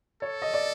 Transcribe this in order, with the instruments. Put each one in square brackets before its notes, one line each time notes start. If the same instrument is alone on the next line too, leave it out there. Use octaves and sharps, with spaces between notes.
[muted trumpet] A4 [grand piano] C#5
[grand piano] D#5
D5